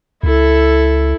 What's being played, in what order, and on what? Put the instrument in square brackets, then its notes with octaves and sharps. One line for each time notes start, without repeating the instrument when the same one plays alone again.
[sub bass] C#2 [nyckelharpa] E4 A4